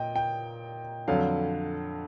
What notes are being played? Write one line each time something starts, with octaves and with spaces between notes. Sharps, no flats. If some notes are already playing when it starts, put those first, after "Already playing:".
Already playing: A#2 D#5 G5
G5
F2 D3 F#3 F5